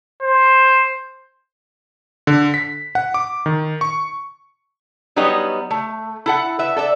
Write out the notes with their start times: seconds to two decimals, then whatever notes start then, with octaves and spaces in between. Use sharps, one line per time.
0.22 C5
2.27 D3
2.54 B6
2.95 F#5
3.14 D6
3.46 D#3
3.81 C#6
5.16 F#3 G3 B3 D#4 C#5 D#5
5.71 A3
6.26 E4 A4 F#5
6.59 B4 E5
6.76 A4 D5 E5